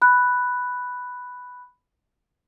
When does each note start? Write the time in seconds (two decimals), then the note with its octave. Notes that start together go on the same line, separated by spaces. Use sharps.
0.02 B5 F#6